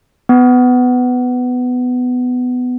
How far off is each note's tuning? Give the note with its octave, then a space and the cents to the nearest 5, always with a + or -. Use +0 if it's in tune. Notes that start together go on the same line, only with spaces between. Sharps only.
B3 +15